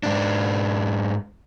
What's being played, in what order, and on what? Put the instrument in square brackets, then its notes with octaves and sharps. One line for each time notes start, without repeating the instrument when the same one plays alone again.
[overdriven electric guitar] G#2 D4